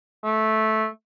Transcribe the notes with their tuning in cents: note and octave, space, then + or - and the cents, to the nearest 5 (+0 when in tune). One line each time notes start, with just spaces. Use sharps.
A3 -10